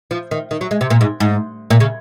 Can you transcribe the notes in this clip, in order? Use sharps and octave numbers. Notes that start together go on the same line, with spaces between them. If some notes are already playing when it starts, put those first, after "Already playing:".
F3
D#3
D#3
F#3
G#3
C3
A#2
G#2
G#2
A#2
C#3